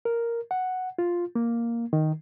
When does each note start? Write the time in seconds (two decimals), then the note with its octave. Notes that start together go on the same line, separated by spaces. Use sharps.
0.05 A#4
0.51 F#5
0.98 F4
1.35 A#3
1.93 D#3